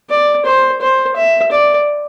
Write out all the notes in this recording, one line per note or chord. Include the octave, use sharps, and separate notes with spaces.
D5
C5
C5
E5
D5